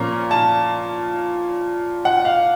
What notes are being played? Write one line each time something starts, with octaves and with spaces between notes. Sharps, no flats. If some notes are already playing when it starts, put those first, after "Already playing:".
Already playing: A#2 F3 A#3 C#4 A#5
A5
F#5
F5